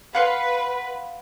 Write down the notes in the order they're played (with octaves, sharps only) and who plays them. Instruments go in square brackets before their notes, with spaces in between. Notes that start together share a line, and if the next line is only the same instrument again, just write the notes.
[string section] B4 [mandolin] F5 F#5 C6